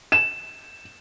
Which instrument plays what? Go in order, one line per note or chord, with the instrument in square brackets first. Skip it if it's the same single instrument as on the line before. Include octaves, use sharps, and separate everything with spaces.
[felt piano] E7